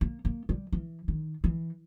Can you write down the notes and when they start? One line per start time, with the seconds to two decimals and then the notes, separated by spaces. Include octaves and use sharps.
0.01 A#3
0.25 A#3
0.49 G3
0.72 E3
1.08 D#3
1.44 E3